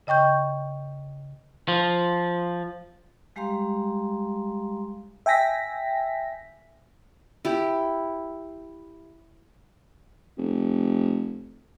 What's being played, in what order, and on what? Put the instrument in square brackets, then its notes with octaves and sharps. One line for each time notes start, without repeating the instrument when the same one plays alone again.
[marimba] C#3 D#5 G5 C#6 G6
[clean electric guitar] F3
[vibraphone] G3 G#3 G4 F5 A#5 C6
[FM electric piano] E5 G5 G#5 A#6 B6
[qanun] E4 G4
[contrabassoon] F1